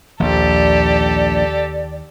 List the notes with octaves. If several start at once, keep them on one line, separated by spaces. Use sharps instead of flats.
A#1 D#2 G4 A4 D5